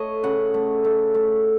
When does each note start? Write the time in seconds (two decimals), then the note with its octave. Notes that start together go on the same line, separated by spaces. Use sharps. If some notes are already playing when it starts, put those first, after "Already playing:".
Already playing: A3 C#5 D#5
0.23 C#3 F#5
0.54 A3
0.84 A3
1.14 A3